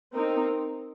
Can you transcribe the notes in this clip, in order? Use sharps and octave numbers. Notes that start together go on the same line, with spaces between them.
C4 D#4 A#4